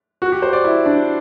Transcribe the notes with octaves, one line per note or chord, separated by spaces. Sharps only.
F#4
G4
C5
D5
E4
D4